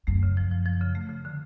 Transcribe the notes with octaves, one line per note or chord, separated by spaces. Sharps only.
F#2 A3
C#3
F3
F3
F3
C#3
A3
C#3
D3